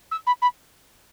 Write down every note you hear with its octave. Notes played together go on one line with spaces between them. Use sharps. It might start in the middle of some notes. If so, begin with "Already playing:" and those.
E6
B5
B5